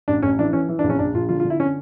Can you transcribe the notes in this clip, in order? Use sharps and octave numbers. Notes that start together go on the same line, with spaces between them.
A1 D4
A1 C#4
E3 D4
E3 C#4
E3
D4
A#1
C#4
A#1 D4
A#1 F4
D3 F4
F4
D3
E4
C#4